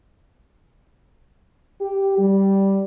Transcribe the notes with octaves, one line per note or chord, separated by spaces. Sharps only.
G4
G3